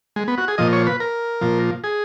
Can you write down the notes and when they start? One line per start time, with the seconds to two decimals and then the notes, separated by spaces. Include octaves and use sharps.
0.16 G#3
0.28 B3
0.38 F#4
0.48 G#4
0.58 A#2 F3 D#5
0.73 C#5
0.87 B4
1.00 A#4
1.41 A#2 F3
1.84 G#4